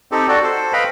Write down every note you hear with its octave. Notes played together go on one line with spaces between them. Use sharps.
C4 D#4 G4 A4
F#4 A4 D5
A4 C5
B4 D#5 F5 G5 B5